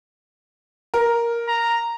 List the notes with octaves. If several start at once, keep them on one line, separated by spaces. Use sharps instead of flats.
A#4
A#5